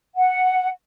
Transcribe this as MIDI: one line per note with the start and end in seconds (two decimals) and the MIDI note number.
0.16 0.67 78